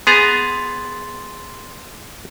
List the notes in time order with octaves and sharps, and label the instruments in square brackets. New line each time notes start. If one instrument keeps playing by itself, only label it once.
[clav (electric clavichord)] B3 G#4 A#5 [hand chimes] C6 A6